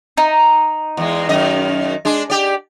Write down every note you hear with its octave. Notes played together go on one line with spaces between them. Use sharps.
D#4
E2 G#3
F#2 D#3 D#5
G#3 D4
G4 D5